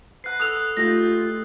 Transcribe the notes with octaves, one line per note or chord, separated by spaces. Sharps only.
B4 F#5 A#5 F#6 C7
A4 D#6 E6 F#6 F7
A3 D#4 F4 G4 A#6